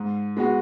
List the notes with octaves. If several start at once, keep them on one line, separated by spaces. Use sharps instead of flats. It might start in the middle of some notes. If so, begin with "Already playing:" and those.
Already playing: G#2
G#3 B3 F#4